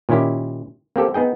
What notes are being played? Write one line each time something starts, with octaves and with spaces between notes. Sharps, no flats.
A#2 D#3 C#4 E4 G4
A#3 C4 G4 A4
B3 D#4 G#4 G5